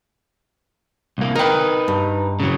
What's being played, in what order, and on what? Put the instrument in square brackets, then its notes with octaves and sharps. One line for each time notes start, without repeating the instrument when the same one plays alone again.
[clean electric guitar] C2 A#3
[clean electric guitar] D#4 B4 [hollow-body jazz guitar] A#4 G5
[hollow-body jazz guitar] G2
[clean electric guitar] C#3 F#3